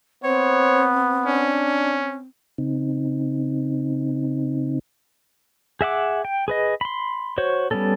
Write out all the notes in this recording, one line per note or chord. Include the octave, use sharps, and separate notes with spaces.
B3 C4 C5 C#5
C#4 D4
C#3 C4 D#4
G#4 E5 F#5 D6
G5
G#4 B4 D#5
B5 C6
F#4 C5 C#5
G3 A#3 B3 C#4 A4